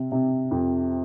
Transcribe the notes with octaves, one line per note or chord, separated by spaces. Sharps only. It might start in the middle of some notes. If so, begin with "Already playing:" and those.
Already playing: C3
C3
F2